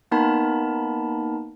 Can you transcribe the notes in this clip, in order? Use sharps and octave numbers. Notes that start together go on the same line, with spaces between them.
A#3 B3 D#4 A#4 A5 B5